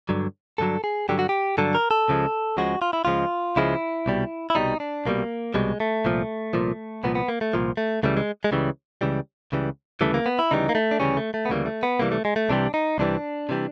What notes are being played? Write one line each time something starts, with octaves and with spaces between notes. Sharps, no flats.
G2 D3 F#3
G2 D3 F#3 A4
G#4
G2 D3 F#3 G4
F#4
G4
G2 D3 F#3 A4
A#4
A4
C#2 C#3 F3 G#3
C#2 C#3 F3 G#3 F#4
F4
E4
C#2 C#3 F3 G#3 F4
C#2 C#3 F3 G#3 E4
C2 B2 G3
E4
C2 B2 G3 D#4
D4
C2 B2 G3 A#3
C2 B2 G3 G#3
A3
C2 A#2 F3
C2 A#2 F3
C2 A#2 F3 B3
B3
A#3
A3
C2 A#2 F3
A3
C#2 C#3 E3 G3 A3
G#3
G#3
C#2 C#3 E3 G3
C#2 C#3 E3 G3
C#2 C#3 E3 G3
D2 C#3 E3 G3 A3
A#3
B3
E4
D2 C#3 E3 G3 D#4
A#3
A3
D4
D2 C#3 E3 G3 C#4
A3
A3
B3
D2 C#3 E3 G3 A#3
A3
B3
C2 C3 E3 G3 A#3
A3
G#3
A3
C2 C3 E3 G3 D4
D#4
C2 C3 E3 G3 D4
C3 E3 G3